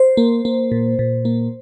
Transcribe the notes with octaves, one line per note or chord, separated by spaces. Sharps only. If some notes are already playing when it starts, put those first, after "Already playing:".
Already playing: C5
A#3
A#3
A#2
A#2
A#3